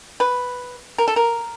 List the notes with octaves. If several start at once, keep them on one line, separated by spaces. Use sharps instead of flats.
B4
A#4
A4
A#4